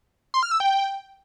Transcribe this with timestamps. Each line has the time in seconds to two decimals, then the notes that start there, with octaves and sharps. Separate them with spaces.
0.34 C6
0.43 F6
0.51 E6
0.60 G5